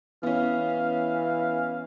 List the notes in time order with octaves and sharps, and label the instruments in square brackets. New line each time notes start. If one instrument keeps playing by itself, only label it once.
[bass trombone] E3 [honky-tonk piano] B3 C#4 [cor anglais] F5